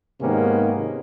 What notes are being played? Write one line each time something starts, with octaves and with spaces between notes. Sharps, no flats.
G#2 C3 D#3 A#3 B3 C#4